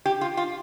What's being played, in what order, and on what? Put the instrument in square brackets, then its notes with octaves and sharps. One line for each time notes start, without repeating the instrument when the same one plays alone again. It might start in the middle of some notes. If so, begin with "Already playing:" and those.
[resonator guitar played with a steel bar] G4
F4
F4